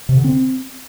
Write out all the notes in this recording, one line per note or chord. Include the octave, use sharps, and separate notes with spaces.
C3
D3
C4